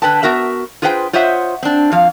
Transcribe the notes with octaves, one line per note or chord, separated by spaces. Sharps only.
D3 B4 G5 A5
B3 F#4 A#4 E5
F4 G#4 B4 C5 F#5 G5
F4 C5 C#5 D#5 E5 F#5
C4 D4
F2 F3 F5